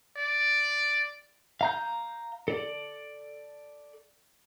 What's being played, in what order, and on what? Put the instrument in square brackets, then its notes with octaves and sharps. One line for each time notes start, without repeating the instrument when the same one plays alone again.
[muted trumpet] D5
[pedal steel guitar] F5 A#5 G6
A4 D5